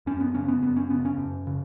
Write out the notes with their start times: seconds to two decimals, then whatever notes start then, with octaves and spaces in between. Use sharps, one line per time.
0.06 F#2 C#4
0.20 B3
0.35 C#3 C#4
0.48 B3
0.62 F#2 B3
0.76 C#4
0.90 C#3 B3
1.05 C#4
1.18 F#2
1.47 C#3